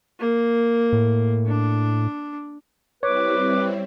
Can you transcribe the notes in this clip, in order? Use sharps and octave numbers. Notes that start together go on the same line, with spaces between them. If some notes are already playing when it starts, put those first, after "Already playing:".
A#3
A2
D4
G3 C4 E4 B4 C#5 D6